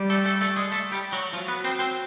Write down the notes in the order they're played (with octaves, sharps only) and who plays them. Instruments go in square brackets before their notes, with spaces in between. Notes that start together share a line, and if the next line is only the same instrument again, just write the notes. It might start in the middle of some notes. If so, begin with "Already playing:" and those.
Already playing: [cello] G3
[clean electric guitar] A3 A4
A3 A4
A3 A4
G#3 G#4
A3 A4
G3 G4
F#3 F#4
[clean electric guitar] F3 F4 [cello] F#3
[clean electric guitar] B3 B4
C4 C5
C4 C5